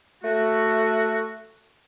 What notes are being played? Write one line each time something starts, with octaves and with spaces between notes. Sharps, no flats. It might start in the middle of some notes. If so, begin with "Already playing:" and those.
A3 F#4